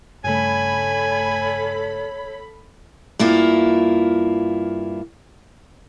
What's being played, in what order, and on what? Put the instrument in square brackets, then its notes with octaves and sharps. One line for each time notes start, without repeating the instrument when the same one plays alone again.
[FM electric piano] G2 C#3 A3 [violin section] A4 B5 [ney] C#5 [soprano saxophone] G#5
[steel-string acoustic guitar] G2 A#3 E4 F4